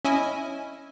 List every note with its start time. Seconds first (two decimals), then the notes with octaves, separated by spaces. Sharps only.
0.05 C#4 E4 D#5 E5 G#5